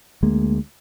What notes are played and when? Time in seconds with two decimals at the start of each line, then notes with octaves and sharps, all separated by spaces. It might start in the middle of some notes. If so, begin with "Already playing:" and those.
0.23 D2 G#3 A#3